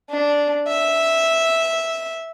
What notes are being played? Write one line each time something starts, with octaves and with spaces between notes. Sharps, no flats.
D4
E5